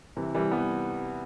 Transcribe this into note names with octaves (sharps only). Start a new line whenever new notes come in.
C3 E3
E3 G3
G3 B3